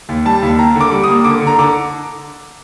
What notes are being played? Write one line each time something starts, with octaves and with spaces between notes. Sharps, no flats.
D#2
G3 A5
D#2
A#3 A#5
D3
D6
G3
A#3 D#6
D3 D6
D3
A#5
D3 D6